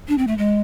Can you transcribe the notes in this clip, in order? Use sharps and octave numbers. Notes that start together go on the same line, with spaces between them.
D4
C4
A3
G#3